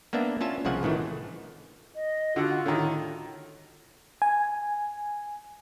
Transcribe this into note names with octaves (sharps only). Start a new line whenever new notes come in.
A#3 B3 D4 E5
C#4 F4 E5 A5
C2 C#3 F3 F#5 G#5
A2 D#3 E3 A3
D#5
D3 F4 F#4 F#5
A2 D3 D#3
G#5